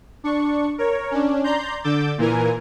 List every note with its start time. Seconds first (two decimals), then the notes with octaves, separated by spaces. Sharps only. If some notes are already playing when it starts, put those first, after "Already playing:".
0.24 D4 C#6
0.78 A#4 C#5
1.11 C#4 D4
1.44 D5 A#5 C6 G6
1.84 D3 D6 E6 G6 A6
2.18 A#2 E3 A#4 G#5